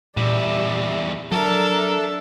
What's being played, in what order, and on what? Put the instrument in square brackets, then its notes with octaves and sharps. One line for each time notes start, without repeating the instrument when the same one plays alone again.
[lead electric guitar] E2 G3 [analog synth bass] A#2 [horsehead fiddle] D5 E5
[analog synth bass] F#3 [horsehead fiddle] D4 E5 [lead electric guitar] A4 A5 [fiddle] A#4